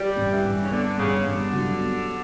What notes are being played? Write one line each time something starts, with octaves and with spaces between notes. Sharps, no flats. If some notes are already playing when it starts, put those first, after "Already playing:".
Already playing: G3
G2
E3
G2
C#3
D3 B3
G2 C#3
G2 D3
F#3
B3